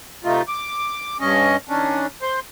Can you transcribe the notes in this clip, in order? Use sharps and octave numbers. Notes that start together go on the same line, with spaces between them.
C3 A3 D#4 F4
D6
G2 C#4 D#5
D#3 C#4 D4
C5 C6